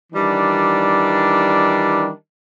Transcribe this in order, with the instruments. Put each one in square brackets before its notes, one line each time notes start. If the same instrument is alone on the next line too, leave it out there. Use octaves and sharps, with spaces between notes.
[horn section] D#3 E3 G3 D4